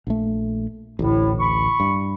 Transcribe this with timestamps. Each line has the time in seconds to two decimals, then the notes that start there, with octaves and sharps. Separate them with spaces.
0.07 A#1 A3
0.99 A1 D2 A2
1.40 B5 C#6
1.80 G2